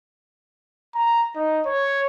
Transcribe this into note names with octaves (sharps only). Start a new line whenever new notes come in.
A#5
D#4
C#5